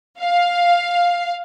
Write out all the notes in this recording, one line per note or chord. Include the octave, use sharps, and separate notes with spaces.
F5